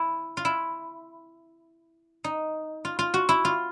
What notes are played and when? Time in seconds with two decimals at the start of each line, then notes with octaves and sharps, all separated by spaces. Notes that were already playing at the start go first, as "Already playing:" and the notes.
Already playing: E4
0.37 F4
0.45 E4
2.24 D#4
2.85 F4
2.99 F4
3.14 F#4
3.29 E4
3.45 F4